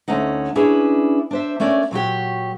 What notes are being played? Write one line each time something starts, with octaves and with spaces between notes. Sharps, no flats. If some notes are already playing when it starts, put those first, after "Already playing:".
D2 A3 C#4 D#4 F#5
C#4 D4 E4 G#4 B4
D4 C5 E5
A3 C#4 A#4 D5
A#2 F#3 F#4 G4